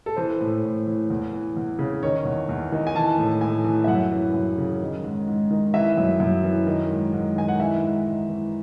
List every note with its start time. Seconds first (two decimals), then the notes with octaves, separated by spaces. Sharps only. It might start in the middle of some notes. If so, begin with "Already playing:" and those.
0.06 A4
0.16 E3 C5
0.41 A2
0.64 A2
0.87 E3
1.10 E2
1.33 E3
1.57 E2
1.79 C#3
2.03 D#3 C#5
2.25 E2
2.49 E2
2.72 D#3
2.87 G#5
2.95 E3 A5
3.18 A2
3.41 A2 G#5
3.64 E3
3.84 E5
3.88 F#2 F#5
4.12 E3
4.34 F#2
4.58 C#3
4.81 D#3
5.04 G#2
5.27 G#2
5.51 D#3
5.74 E3 E5
5.97 F#2
6.20 F#2
6.44 E3
6.67 D#3
6.90 G#2
7.13 G#2
7.36 D#3 G#5
7.48 F#5
7.60 E3 E5
7.83 G#2
8.06 G#2
8.29 E3